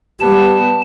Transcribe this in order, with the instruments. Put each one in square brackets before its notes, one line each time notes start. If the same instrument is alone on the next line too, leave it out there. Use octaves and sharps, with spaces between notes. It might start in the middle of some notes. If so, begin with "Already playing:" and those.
[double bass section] G3 B3 [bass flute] G4 [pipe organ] A5